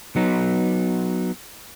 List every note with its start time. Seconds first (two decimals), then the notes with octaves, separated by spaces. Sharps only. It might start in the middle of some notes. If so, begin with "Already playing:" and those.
0.16 F#3 B3 D#4